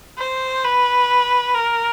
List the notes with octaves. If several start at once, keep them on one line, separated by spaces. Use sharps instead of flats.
C5
B4
A#4